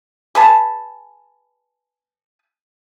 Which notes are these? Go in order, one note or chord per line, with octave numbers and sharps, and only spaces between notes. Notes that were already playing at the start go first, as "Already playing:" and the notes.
G#4 B4 A5